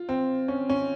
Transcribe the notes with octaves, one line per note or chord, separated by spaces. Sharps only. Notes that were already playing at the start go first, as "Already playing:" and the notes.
Already playing: F4
C4
C#4
C#4